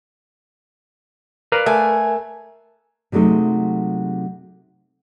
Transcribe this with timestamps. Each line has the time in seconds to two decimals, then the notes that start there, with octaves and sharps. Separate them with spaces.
1.52 A#4 B4 D5 F5
1.66 A3 G#5
3.12 C3 F#3 G#3 A3 D#4